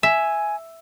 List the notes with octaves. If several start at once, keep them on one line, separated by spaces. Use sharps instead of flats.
E5 G#5